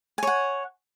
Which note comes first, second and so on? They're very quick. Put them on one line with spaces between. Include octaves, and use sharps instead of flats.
G#5 C#5 F#5